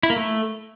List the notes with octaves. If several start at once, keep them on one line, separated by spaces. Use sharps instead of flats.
E4
A#3
A3